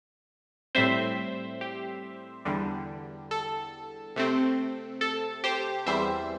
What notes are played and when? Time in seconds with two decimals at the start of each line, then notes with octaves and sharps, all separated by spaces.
0.75 A2 G3 C4 C5 E5
1.61 G4
2.45 E2 D3 G3
3.31 A4
4.16 C3 A3 C4
5.01 A4
5.44 G4 C5
5.86 E2 E3 G3 C4 C5 E5